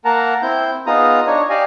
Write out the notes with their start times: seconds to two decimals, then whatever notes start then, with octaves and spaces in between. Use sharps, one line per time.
0.05 A#3 A#4 F#5 A5 A#5
0.42 C4 E4 G6
0.87 B3 D#4 F4 G#4 A#5 D#6
1.27 D4 D#4 C#5
1.50 G4 D5 D#5 F5 G#5